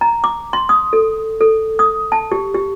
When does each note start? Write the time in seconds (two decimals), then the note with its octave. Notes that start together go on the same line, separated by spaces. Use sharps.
0.01 A#5
0.24 D6
0.53 C6
0.69 D#6
0.93 A4
1.41 A4
1.79 D#6
2.12 A5
2.32 G4
2.55 G4